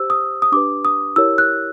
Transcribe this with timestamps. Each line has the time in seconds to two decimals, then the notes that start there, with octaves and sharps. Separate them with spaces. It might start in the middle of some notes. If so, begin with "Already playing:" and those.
Already playing: G4 C5 E6
0.10 D#6
0.42 D#6
0.52 D4 G4 B4 D6
0.85 D#6
1.16 E4 G4 A#4 C#5 E6
1.38 F#6